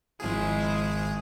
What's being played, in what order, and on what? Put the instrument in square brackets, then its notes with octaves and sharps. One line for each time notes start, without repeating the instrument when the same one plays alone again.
[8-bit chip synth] G#1 G#4 [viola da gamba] F3 G#3 E4